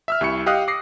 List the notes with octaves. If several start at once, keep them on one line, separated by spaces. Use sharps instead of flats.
E5 E6 F6
C2 G3 E4 C#6 F6 C#7
G4 D#5 F5 D#6 F#6
D6 A#6 C7